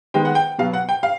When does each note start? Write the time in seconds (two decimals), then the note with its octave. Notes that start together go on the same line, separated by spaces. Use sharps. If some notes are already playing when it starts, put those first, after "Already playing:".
0.14 D#3 G#3 B3 G5
0.25 F#5
0.35 G5
0.58 B2 F#3 B3 F5
0.73 F#5
0.89 G5
1.03 F5